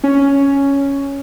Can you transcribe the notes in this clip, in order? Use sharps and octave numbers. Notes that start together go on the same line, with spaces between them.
C#4